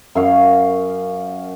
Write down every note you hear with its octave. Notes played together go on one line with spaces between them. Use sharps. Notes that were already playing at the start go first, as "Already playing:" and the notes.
F#2 F5